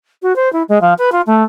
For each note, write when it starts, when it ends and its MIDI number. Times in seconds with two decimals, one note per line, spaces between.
0.22 0.35 66
0.36 0.51 72
0.53 0.63 64
0.69 0.81 56
0.81 0.94 53
0.98 1.10 71
1.12 1.21 65
1.26 1.43 57